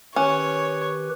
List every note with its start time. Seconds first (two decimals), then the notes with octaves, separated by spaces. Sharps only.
0.16 D#3 C#4 G4 B4 C#5